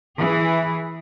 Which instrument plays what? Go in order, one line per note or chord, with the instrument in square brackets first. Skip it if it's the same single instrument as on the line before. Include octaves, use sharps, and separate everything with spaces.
[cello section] E3 G#4